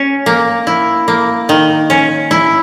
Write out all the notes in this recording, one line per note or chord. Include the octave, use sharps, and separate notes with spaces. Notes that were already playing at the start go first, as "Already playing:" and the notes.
Already playing: C#4
A#3
E4
A#3
D#3
C#4
E4